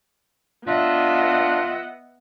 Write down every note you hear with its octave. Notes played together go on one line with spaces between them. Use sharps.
B3 D4 F4 D#5 E5 F#5 F#6